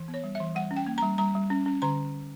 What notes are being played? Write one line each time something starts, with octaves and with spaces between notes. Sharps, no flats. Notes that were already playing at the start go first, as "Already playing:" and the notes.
Already playing: E3
B3
C#5
G3
E5
E3
G3 F#5
C#4
G5
A#3
G3 A#5
G3 A#5
G3
C#4
C#4
D3 A#5